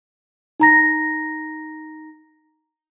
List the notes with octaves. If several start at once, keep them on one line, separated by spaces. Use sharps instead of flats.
D#4 A#5 A#6